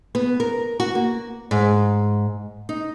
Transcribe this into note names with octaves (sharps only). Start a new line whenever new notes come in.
B3
A#4
F#4
A#3
G#2
D#4